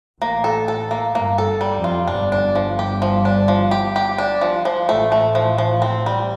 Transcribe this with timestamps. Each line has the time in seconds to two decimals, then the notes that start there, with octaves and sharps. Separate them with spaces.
0.21 A1 A2 A#3
0.44 A4
0.68 A4
0.91 A#3
1.14 G1 G2 A#3
1.38 A4
1.61 G3
1.77 F2
1.84 F4
2.07 G1 G2 D4
2.32 D4
2.55 F3
2.79 G4
3.02 F3
3.25 D4
3.48 F3
3.71 G4
3.96 G4
4.18 D4
4.41 F3
4.65 F3
4.88 A1 A2 A3
5.12 A3
5.35 F3
5.58 F3
5.82 C4
6.06 G3